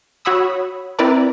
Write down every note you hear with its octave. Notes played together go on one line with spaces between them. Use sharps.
F#4 C#5 F#5 B5 D#6 E6
C4 E4 A#4 B4 D5 A#5